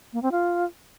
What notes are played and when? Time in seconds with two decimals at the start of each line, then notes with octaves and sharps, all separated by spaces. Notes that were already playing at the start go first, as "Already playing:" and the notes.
0.13 A#3
0.22 C4
0.32 F4